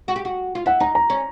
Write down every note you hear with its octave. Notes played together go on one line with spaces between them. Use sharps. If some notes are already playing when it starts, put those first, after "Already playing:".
F#4
G4
F#4
F4
E4 F#5
D#4 A#5
A#5
C#4